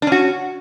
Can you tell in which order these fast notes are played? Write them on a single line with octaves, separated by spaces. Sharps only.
D4 C#4 F#4